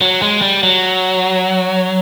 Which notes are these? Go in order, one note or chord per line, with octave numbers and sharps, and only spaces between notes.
F#3
G#3
G3
F#3